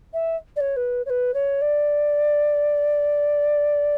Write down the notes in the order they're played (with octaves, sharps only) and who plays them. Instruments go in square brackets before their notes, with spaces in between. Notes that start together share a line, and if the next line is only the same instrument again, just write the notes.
[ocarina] E5
D5
C#5
B4
C#5
B4
C#5
D5